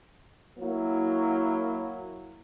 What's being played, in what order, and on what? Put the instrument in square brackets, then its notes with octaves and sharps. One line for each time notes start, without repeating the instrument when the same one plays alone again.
[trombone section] F#3 A#3 E4